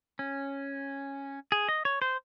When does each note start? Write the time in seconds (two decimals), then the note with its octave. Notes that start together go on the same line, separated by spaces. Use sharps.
0.19 C#4
1.52 G#4
1.69 D#5
1.85 C#5
2.02 C5